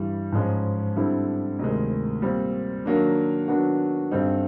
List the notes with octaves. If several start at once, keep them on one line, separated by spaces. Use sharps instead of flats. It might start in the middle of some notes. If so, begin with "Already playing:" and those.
Already playing: G2 E3 G3
G#2 F3 G#3 C#4
D3 G3 C4 E4
D2 C3 D#3 G#3
A#2 G3 C4
D#3 F#3 A#3 D4
D#3 F#3 B3 D4 F#4
G2 D3 G3 C4 D#4